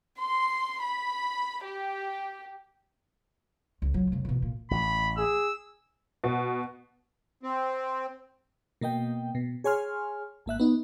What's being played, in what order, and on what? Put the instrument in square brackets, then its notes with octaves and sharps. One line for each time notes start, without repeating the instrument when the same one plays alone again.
[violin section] C6
B5
G4
[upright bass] C#2
C#2 F#3
F1 C#3
B2 E3
A#2
[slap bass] A1 [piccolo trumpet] B5
[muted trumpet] G#4 [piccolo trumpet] E6
[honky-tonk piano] B2
[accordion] C4
[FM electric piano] B2 A#3 D#5 G5
B2
G#4 C#5 G#5 C6 F6
G#1 A#3 E5 F#6
B3 D#4